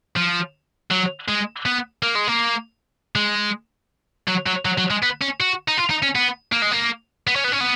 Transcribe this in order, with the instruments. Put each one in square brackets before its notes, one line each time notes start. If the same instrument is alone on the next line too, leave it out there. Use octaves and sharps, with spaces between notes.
[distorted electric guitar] F3
F#3
G#3
B3
A#3
G#3
A#3
G#3
F#3
F#3
F#3
F#3
G#3
B3
C#4
F#4
D#4
F4
D#4
C#4
B3
A#3
G#3
A#3
B3
C#4
B3
C#4
B3